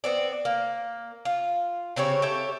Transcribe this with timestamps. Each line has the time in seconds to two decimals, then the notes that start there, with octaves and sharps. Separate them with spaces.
0.04 B3 C4 D5
0.45 A#3
1.25 F4
1.96 C#3 C4 G4 C#5
2.22 G4 A4 C#5 E5